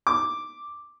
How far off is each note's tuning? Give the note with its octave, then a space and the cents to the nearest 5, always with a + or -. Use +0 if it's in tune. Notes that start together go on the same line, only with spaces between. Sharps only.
D6 +0